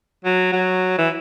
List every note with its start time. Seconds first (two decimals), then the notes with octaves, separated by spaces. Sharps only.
0.25 F#3
0.52 F#3
0.98 E3